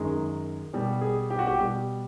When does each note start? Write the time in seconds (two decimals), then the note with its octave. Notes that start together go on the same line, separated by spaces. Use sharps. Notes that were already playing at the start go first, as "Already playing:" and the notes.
Already playing: F#2 D#3 G#3
0.74 B2 G3
1.01 G#4
1.30 G4
1.39 F#4
1.47 G4
1.58 B2 G3